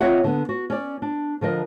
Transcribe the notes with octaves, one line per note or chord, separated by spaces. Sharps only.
C4 F4 C#5 D#5 E5 F#5
D3 B3
F#4
C#4 D5
D4
D3 F3 A#4 D#5